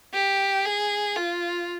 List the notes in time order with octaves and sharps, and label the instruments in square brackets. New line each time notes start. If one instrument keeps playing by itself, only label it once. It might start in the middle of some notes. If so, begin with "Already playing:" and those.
[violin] G4
G#4
F4